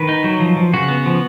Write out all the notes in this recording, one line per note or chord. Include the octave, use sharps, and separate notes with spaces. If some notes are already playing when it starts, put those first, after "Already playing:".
Already playing: D#3 B4
D#4
F#3
F3
F3
C#3 F#4
B3
F3